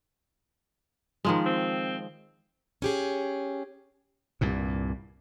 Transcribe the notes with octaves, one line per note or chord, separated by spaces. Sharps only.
D#3 F3 G#3
C4
C#4 G4 G#4
C2 G2 A#2